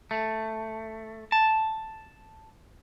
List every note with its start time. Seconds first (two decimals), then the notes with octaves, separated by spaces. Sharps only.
0.11 A3
1.32 A5